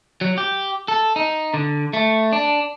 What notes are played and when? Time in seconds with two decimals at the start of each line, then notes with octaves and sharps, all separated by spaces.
0.21 F#3
0.38 G4
0.88 A4
1.16 D#4
1.54 D3
1.93 A3
2.32 D4